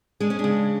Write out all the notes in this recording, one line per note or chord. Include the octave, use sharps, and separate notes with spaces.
G#3 D4
C#4
D4
C#3